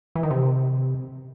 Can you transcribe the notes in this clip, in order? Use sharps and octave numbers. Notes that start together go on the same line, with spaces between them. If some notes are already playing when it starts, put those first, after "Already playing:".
E3
D#3
C3